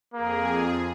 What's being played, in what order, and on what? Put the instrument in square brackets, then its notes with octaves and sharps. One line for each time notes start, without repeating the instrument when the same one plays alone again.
[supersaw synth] F2 G#4 [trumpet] A#3